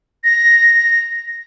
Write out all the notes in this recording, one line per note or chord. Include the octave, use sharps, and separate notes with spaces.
A#6